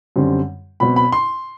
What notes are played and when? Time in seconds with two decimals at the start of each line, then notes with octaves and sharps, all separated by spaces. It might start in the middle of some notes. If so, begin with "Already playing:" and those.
0.16 F#2 D3 G3 C4
0.80 B2 F#3 C4 B5
0.96 B5
1.12 C6